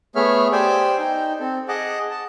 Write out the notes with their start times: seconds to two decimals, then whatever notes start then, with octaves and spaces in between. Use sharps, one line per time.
0.16 A3 B3 G#4 C#5 E5 F6
0.52 G4 C5 D5 G#5 D6 E6
0.98 D#4 G5
1.40 C4 A4
1.68 G#4 D#5 F#5 A5 D6
2.10 A5